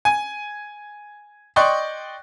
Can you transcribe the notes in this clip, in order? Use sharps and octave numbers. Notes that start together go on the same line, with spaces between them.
G#5
D5 D#5 G5 C6 C#6 F#6